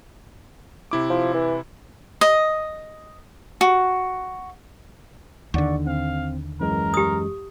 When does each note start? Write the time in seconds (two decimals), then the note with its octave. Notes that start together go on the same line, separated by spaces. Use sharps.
0.91 C3 E4 D6
1.10 F3
1.34 E3
2.21 D#5
3.61 F#4
5.54 D#2 D3 D5 F#5 C#6
5.87 C4 F5
6.60 F#2 E3 G#3 A#4
6.94 G4 D#6